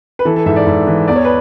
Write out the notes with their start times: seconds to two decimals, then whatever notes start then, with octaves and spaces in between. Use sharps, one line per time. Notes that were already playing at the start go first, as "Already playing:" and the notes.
0.19 B4
0.25 E3 A4
0.36 A4
0.46 G#2 E5
0.56 D5
0.67 G#2
0.87 E3
1.08 E2 D5
1.16 C#5
1.25 B4